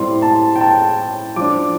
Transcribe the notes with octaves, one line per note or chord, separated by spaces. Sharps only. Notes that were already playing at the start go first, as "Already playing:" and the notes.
Already playing: A2 G3 C4 C6
A5
G5
A5
F3 D4 D6